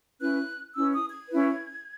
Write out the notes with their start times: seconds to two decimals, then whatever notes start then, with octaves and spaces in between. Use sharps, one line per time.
0.19 C#4 E4 B4 F#6
0.75 C#4 E4 B4 E6
0.92 D#6
1.10 G#6
1.29 C#4 E4 B4